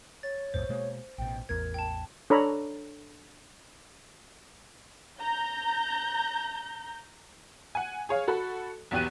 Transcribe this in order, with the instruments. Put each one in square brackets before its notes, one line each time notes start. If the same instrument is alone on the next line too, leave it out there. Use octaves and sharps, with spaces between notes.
[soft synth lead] C#5 [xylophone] A6
[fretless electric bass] B1 F2 A2 [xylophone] C5
[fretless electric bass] B2 G#3 A#3
[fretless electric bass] A1 B2 [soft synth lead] G5
[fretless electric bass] A1 E2 [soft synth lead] A#4 [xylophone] G#6
[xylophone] G5 A5
[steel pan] D4 A4 C#5 A#5 B5
[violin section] A#5 G6
[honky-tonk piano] F#5 G#5
G#4 C#5 F5
F#4 A4 B5
B1 E2 B3 G4 F#6 D#7